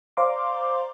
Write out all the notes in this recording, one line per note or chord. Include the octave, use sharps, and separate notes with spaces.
C5 D5 F5 A#5 C6 D6